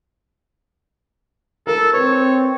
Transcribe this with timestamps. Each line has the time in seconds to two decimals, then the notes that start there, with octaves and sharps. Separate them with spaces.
1.67 A4 A#4
1.93 C4 B4 C#5